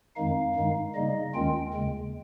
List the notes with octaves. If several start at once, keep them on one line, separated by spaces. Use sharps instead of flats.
F2 D#3 G#3 D#4 F5
G2 D#3 G#3 D#4
C#3 G3 A#3 D#4 D#5
D#2 D#3 G#3 C#4 F4 G5
D#2 C#3 G#3